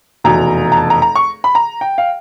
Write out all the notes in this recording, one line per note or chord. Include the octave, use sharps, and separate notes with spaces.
F1 E2 B2 A#5
A#5
A5
A#5
A#5
C#6
B5
A#5
G5
F5